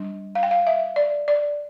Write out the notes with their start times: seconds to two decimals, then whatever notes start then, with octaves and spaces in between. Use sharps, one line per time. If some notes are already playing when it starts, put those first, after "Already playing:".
Already playing: G3 D4
0.35 F5
0.43 G5
0.51 F5
0.67 E5
0.96 D5
1.28 D5